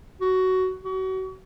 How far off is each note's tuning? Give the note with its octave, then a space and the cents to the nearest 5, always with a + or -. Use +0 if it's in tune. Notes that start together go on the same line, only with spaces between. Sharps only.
F#4 +15
F#4 +35